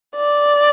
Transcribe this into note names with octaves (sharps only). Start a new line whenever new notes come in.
D5